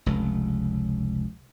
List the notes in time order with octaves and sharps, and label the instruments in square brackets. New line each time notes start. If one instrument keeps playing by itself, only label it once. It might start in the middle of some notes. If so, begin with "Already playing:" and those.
[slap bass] F1 C#2